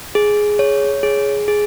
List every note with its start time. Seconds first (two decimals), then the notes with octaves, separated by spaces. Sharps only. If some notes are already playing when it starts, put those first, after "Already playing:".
0.15 G#4
0.59 C#5
1.03 G#4
1.48 G#4